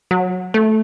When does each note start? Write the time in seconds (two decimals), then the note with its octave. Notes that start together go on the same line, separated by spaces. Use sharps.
0.11 F#3
0.54 A3